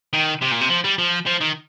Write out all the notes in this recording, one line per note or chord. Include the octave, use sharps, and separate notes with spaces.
D#3
C3
A#2
C3
F3
G3
F3
F3
D#3